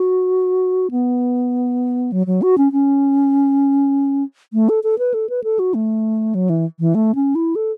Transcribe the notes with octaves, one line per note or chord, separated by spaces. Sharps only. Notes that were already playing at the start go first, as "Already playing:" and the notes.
Already playing: F#4
B3
F#3
F#3
F#4
C#4
C#4
A3
A4
A4
B4
A4
B4
A4
F#4
A3
F#3
E3
E3
A3
C#4
E4
A4